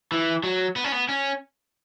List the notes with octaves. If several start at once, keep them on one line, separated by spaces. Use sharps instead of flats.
E3
F#3
B3
C#4
B3
C#4